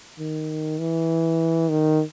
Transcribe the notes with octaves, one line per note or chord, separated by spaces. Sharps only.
D#3
E3
D#3